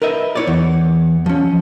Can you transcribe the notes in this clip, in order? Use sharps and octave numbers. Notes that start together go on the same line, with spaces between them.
A#4 B4 D#5 E5
E4 C#5 D5
E2
F3 C#4